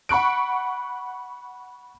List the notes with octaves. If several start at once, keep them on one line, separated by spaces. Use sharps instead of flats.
F#5 B5 C#6 F#6 D7